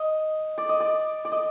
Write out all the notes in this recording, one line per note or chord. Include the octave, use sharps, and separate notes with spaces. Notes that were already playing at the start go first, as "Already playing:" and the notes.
Already playing: D#5
D5
D#5
D5
D5
D#5